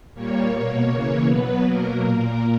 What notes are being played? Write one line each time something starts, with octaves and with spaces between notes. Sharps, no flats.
A#2 G3 A#3 C#5
B2 A#3
C#3 E3 A#3
B2 F#3 B3 B4
B2 F#3 A#3 A#4
A#2 A#3